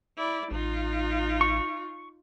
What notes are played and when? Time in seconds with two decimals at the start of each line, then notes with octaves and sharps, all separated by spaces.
0.17 E4 D5
0.51 A1 D#4 F4
1.41 C#6